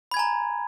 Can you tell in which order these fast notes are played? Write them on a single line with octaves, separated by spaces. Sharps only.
B5 G#6 G#5 A#5